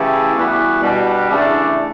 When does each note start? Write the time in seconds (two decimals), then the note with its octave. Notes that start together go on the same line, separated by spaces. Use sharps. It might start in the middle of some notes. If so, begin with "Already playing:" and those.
Already playing: C#3 E3 A3 E4 G4
0.35 E3 G3 B3 F#4
0.82 B2 G3 D4
1.29 C#3 E3 A3 D4